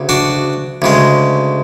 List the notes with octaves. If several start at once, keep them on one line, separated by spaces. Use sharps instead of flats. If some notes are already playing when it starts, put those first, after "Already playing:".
Already playing: D2 C#3
D4 F#4
D2 C#3 G#3